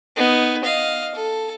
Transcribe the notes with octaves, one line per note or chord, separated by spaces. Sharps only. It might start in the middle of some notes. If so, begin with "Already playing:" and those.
B3 D#4
D#5 F5
A4